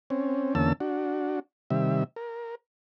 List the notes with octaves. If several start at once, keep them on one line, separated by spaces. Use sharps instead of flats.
C4 C#4
E2 D3 A#3 C#4 A5 E6
D4 F#4
C3 D#3 G3 E5
A#4